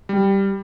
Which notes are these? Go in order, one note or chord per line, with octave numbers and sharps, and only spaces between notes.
G3